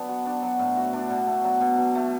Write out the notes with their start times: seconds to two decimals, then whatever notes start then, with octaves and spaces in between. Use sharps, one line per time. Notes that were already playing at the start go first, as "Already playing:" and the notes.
Already playing: D3 F#3 B3 D4
0.08 F#4
0.26 D4
0.42 F#3
0.59 A2
0.76 F#4
0.93 D4
1.10 B2
1.26 A3
1.44 F#3
1.61 B2
1.78 B2
1.95 A3